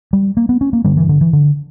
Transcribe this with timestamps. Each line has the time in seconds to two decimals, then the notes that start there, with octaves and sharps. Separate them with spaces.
0.13 G3
0.37 A#3
0.49 B3
0.61 C#4
0.73 A#3
0.84 G2 D3 G3
0.97 E3
1.09 D3
1.21 E3
1.33 D3